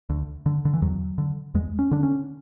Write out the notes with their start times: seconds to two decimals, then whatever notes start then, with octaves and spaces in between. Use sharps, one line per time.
0.10 D2
0.46 D3
0.65 D3
0.74 E3
0.82 E2 F#3
1.18 D3
1.54 E2 G#3
1.79 C#4
1.91 D3 D4
2.03 C#4